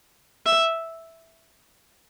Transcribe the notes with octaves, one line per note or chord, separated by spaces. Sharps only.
E5